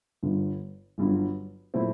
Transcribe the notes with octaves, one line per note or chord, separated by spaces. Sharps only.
G1 G2 D3
G1 G2 D3 F#3
A#2 F#3 A3 C4 E4